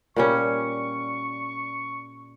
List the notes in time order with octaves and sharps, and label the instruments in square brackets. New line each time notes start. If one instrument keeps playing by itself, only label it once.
[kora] A#2 G3 C#4 [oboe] C#6